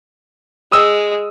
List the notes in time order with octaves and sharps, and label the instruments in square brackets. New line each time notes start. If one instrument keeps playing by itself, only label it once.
[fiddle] G#3 [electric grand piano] D#6 E6